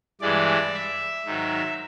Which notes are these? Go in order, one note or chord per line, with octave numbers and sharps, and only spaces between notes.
G2 E3 G#3 D5
E5
G#2 D#3 F#3